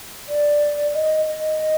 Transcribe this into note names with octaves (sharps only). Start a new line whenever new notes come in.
D5
D#5
D#5